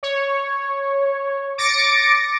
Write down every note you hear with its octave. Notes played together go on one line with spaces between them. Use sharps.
C#5
D6 A6 A#6 C#7 D7